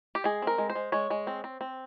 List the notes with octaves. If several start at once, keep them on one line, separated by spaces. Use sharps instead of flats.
G4
G#3 G#4
C4 A#4
G#3
C5
G#3
G#3 C#5
G#3
C4
C4
C4